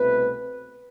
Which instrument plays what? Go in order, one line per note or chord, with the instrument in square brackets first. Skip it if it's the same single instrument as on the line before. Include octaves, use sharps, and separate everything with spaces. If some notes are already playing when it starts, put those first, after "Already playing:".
Already playing: [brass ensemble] C2 B2 A3 C4 B4